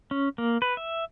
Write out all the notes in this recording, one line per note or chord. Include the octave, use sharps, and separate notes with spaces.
C#4
A#3
B4
E5